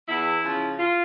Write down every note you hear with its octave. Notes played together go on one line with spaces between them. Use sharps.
E2 E4
C#3 F3
F4